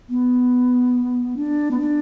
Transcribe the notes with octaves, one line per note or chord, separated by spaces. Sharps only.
B3
D4
B3
D4